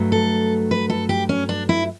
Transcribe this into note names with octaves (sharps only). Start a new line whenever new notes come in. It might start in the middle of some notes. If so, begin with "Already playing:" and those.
Already playing: G2 F#3 A3
A4
B4
A4
G4
C#4
D4
E4